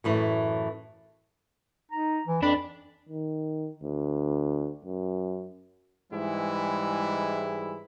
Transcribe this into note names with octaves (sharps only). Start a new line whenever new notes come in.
F#2 A2 E3
D#4 A#5
E3
F2 D4 B5
D#3
D2
F#2
G#2 E3 G3 G#3 E4